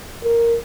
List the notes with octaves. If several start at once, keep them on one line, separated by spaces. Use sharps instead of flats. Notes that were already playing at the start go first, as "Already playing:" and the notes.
A#4